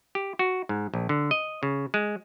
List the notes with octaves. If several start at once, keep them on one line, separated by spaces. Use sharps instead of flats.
G4
F#4
G#2
A#1
D3
D#5
C#3
G#3